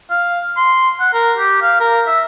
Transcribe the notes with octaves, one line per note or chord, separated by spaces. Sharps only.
F5
C6
F#5
A#4
G4
F5
A#4
E5